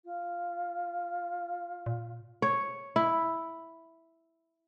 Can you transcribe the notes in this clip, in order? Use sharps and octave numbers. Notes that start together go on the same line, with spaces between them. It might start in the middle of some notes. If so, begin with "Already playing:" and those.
F4
A#2
C#5
E4